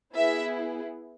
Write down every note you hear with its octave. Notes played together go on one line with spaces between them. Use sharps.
B3 E4 G#4 E5